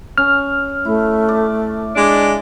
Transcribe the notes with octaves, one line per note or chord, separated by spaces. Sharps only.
C#4 F6
A3 E4
D5
G#3 D4